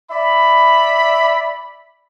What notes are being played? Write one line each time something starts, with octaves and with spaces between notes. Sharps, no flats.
D5 E5 B5